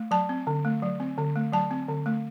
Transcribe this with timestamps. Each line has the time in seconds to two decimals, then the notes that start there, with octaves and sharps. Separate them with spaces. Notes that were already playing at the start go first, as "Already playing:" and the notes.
Already playing: A3
0.11 F#3 A5
0.29 C4
0.47 D3
0.65 A3
0.82 F#3
1.00 C4
1.18 D3
1.36 A3
1.53 F#3 A5
1.71 C4
1.88 D3
2.06 A3